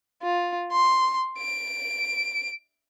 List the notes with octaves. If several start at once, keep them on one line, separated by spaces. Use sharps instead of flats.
F4
C6
D7